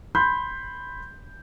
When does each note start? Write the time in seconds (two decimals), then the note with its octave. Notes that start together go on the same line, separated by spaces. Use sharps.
0.15 B5 C6 G6